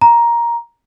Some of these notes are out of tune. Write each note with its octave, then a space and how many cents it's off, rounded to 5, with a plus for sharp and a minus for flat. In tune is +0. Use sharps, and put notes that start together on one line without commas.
A#5 +10